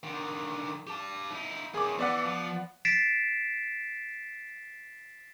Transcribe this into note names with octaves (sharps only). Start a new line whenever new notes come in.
D3 D#3
G4 A5
D#4 E4
F#2 D#3 G#4 D6
E3 B3 D5 F#5
F3
A6 B6 C7 D7 E7